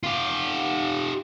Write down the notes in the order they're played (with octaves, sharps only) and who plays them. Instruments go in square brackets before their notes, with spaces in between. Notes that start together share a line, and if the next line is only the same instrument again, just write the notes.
[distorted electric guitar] F4 G4